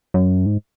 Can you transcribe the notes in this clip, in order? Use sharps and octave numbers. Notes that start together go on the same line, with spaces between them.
F#2
G#2